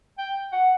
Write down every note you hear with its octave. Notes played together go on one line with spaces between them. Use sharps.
G5
F#5